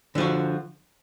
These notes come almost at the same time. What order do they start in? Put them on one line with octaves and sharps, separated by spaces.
D3 F3 F#4